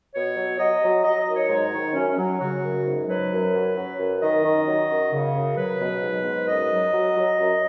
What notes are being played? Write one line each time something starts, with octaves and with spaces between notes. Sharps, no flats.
B2 C#5
F#3
F#3 D#5
F#3
F#3 D#5
D#5
D#3
C#5
G#2 C#5
D#3
F#2 C#4
F#3
C#3 F#4
F#2
G#2
F#3 B4
F#2
F#3
F#3
F#2
D#3 D#5
D#3
F#3
F#2
C#3
F#2
F#3 B4
B2
G#2
G#2
F#2 D#5
F#3
F#3
F#3
F#2